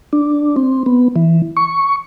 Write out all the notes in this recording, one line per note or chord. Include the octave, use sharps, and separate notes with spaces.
D4
C4
B3
E3
C#6